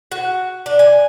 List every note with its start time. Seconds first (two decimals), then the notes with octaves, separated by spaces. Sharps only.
0.12 F#4
0.66 D4
0.79 G#5